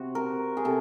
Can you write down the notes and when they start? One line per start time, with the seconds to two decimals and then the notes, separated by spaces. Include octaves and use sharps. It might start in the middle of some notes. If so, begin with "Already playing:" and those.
Already playing: C3 F#4
0.15 A#4
0.57 G#4
0.65 C3 A4